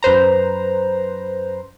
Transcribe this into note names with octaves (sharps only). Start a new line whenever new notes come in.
F#2 B4 C5 A#5